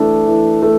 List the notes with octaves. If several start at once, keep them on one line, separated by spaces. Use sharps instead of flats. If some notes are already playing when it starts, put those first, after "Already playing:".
Already playing: E3 A3 D4
E3
A3